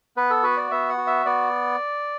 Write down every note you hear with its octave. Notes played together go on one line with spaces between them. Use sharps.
B3 B4
A4
F#4 B4
D5
B3 E5
F#5
F#4
E5
B3 D5